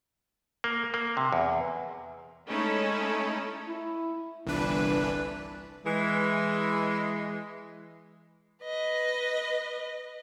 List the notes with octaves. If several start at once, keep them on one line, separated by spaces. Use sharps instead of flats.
A#3
A#3
C3
E2
G#3 A3 C#4 D#4 E4 A4
E4
G1 C2 E3 D4 B4
E3 G#3
B4 D#5